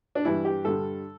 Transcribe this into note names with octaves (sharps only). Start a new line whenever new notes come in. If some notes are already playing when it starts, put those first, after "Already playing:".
D4
G2 E3 G3 E4
G4
G2 D3 G3 A4